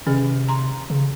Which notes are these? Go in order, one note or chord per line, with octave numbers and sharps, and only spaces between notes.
C3 D#3 C#4 G#4
A#5 C6
C#3